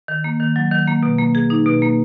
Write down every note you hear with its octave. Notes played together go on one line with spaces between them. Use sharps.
D#3
A#3
D#3
F#3
D#3
A#3
B2
A#3
G#4
D#4
B2
A#3